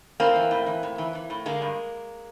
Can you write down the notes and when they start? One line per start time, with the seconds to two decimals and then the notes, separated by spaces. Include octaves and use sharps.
0.20 A2 A#3 C4
0.35 E3
0.51 A2
0.66 E3
0.83 A2
0.98 E3
1.15 E3
1.30 A2
1.46 D3 G#3 A#3
1.62 G2